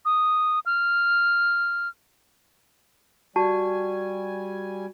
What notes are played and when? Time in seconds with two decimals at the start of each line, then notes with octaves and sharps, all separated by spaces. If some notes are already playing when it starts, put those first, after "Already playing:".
0.05 D#6
0.66 F6
3.36 G3 F#4 G#5 A5